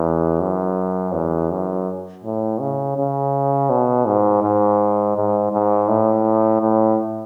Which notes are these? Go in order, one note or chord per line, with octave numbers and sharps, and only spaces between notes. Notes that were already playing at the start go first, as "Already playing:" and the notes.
Already playing: E2
F#2
E2
F#2
A2
C#3
C#3
B2
G#2
G#2
G#2
G#2
A2
A2